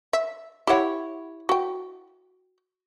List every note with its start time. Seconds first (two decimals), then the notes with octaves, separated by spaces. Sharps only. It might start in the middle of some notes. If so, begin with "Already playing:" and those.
0.13 E5
0.67 E4 G4 C#5 F#5
1.49 F#4 G5